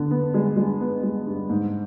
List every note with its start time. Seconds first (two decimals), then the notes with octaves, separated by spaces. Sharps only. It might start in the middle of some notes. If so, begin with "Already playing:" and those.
Already playing: D3 B3
0.11 B3
0.34 G#3
0.57 G#3
0.80 B3
1.03 G#3
1.26 G2
1.49 G#2